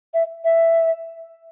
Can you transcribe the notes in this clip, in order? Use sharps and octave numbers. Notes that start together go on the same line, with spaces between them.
E5
E5